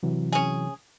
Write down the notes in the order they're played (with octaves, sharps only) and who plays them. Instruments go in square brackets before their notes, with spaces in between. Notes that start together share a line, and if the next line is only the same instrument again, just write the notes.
[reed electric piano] C3 E3 F#3
[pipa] C#4 G#4